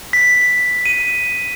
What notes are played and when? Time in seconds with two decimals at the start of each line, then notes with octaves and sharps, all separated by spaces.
0.13 B6
0.85 D#7